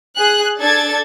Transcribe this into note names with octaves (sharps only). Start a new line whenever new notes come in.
G#4 F#6
D4 A4 G#6 A6